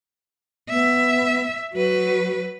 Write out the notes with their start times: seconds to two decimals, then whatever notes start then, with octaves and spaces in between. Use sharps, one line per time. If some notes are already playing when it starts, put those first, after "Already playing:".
0.70 B3 E5
1.74 F#3 F#4 B4